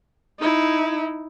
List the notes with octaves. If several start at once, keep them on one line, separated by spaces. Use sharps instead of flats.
D#4 E4